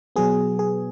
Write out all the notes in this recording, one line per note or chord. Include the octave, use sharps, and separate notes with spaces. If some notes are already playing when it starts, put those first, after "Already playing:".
B2 F#3 B3 G#4
G#4